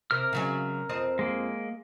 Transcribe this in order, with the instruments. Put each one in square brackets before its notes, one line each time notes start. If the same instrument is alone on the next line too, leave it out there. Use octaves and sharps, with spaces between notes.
[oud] C3 [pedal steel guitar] A#4 F6
[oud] C#3 F#3 G#3
F2 C4 D#5
[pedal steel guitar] G#3 A#3